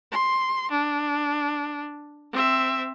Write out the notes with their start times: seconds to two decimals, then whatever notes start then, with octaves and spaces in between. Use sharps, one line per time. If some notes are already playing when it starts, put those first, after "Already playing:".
0.11 C6
0.71 D4
2.32 C4 E5